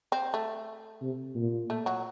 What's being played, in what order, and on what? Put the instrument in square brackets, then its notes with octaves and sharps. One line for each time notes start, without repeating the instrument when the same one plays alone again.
[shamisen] C4
A3
[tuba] C3
A#2
[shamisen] A3
F#3